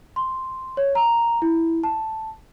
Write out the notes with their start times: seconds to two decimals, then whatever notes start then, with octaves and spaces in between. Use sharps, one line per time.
0.16 C6
0.77 C#5
0.95 A#5
1.42 E4
1.84 A5